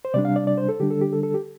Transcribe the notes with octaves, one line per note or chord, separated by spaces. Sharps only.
C5
C3 G3 D4 D5
F5
D5
D5
C5
A4
D3 G3 D4 G4
A4
G4
A4
A4
G4